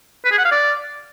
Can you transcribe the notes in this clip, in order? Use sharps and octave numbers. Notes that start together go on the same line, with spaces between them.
B4
G#4
F#5
F5
D5